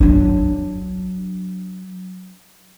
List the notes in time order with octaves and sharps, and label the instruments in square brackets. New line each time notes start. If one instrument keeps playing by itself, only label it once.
[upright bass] F#3 D4